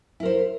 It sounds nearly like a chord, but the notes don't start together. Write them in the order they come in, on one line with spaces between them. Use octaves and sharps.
E4 A#4 C5